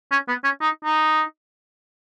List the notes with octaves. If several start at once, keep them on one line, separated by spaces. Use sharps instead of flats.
C#4
B3
C#4
D#4
D#4